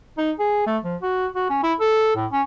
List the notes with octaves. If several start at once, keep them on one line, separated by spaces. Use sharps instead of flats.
D#4
G#4
A3
F3
F#4
F#4
C#4
E4
A4
A2
C#4